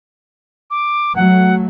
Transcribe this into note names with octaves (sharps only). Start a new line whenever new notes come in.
D6
F#3 A3 F#5